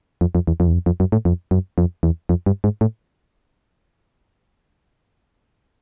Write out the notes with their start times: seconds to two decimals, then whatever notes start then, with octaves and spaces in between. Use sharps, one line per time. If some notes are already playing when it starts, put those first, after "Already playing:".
0.21 F2
0.35 F2
0.47 E2
0.60 F2
0.67 E2
0.73 F2
0.86 F2
1.00 F#2
1.12 A2
1.25 F2
1.51 F#2
1.78 F2
2.03 E2
2.29 F2
2.46 G2
2.64 G#2
2.81 A2